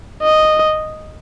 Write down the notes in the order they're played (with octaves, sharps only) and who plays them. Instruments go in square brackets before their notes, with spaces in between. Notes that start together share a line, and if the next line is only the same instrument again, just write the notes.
[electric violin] D#5